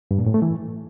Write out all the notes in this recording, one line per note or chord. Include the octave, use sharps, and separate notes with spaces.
G2
A#2
A2
A3
E3